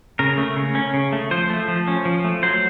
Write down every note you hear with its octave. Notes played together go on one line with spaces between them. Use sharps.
C#3 A#4
A3
C#3
C#4
C#3
A3
F3 C5
A3
F3
C#4
F3
A3
F#3 C5